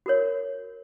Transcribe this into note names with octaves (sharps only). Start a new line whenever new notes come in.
F#4 A#4 C#5